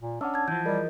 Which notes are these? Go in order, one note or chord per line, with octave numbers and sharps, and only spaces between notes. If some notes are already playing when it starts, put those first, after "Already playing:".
A#2
C#4 D4 F#5 E6
A5 G#6
E3 F3 G6
G3 G#4 A#4 D#5